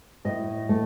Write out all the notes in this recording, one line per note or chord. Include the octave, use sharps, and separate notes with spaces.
A2 D#5
A3